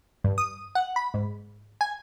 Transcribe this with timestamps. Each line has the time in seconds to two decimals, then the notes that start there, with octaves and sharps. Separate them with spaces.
0.24 G2
0.38 D#6
0.75 F#5
0.96 B5
1.14 G#2
1.81 G#5